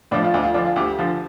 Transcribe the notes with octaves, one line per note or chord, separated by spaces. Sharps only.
A2 F3 D4
F4
D2 D4
F4
D3 F3 D4
F4
D2 G4
D3 F3